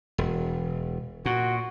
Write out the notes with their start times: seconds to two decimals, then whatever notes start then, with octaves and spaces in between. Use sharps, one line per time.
0.18 E1
1.26 A#2 F#4